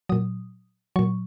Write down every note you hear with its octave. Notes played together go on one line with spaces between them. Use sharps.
A#2 F#3 D#6
A#2 F#3 C#6